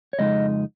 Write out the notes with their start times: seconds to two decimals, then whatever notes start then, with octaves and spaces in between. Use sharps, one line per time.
0.13 C#5
0.18 F2 C#3 G#3 D#4 D#5